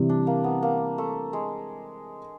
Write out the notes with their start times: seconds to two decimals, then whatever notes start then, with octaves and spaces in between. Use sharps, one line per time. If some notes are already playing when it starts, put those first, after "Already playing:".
Already playing: C3 E3 G3
0.09 D4
0.27 A#3
0.44 B3
0.62 A#3
0.98 A3
1.33 G#3